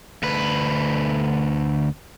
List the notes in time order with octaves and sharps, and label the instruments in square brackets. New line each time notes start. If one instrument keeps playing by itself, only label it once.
[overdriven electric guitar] D2 B4